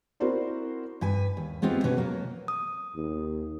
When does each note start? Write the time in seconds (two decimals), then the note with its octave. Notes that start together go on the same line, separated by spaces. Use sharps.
0.20 C4 E4 F#4 A#4 C5 D5
1.01 G2 B4 G#5
1.37 D#2
1.62 G#3 B3 C4 F4 G4
1.84 B2 C#4 B4
1.97 F#3 A#3
2.48 D#6
2.96 D#2